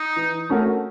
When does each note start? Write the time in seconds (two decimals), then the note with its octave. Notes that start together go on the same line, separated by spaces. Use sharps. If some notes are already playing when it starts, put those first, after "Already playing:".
Already playing: D#4
0.16 E3
0.49 A3 C#4 F#4 A#4